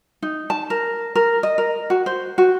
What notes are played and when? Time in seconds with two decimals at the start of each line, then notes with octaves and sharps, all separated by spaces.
0.22 D#4
0.50 A5
0.70 A#4
1.15 A#4
1.43 D#5
1.58 A#4
1.90 F#4
2.06 C5
2.38 F#4